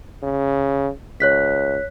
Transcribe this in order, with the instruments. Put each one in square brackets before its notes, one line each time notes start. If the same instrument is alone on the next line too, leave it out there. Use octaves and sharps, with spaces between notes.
[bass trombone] C#3
[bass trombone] C#2 [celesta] C#5 F#6 B6